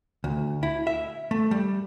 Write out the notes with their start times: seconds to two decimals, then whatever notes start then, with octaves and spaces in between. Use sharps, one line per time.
0.24 D2
0.63 E4
0.87 E5
1.31 A3
1.51 G3